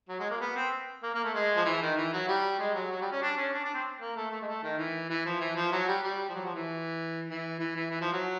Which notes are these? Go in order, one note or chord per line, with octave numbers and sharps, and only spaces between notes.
F#3
G#3
A#3
B3
C4
A#3
A#3
A3
G#3
F3
E3
D#3
E3
F#3
G3
G#3
F#3
F#3
G3
C#4
D4
C#4
D4
D4
C4
A#3
A3
A3
G#3
A3
D#3
E3
E3
F3
E3
F3
F#3
G3
G3
F3
F#3
F3
E3
E3
E3
E3
E3
F3
F#3